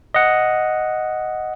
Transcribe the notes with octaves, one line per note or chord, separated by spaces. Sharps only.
D#5 F#5